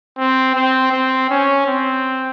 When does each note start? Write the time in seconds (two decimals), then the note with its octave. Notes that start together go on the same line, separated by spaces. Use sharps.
0.18 C4
0.55 C4
0.92 C4
1.30 C#4
1.67 C4